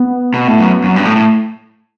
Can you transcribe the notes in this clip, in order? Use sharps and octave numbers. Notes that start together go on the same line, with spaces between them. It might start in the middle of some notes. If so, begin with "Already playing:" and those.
Already playing: B3
B2
A2
F#2
F#2
G2
A2
A2